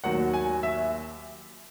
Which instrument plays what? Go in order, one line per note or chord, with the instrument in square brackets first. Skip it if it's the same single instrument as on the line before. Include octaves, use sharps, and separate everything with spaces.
[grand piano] D#2 D#3 F#3 F#5
G#5
E5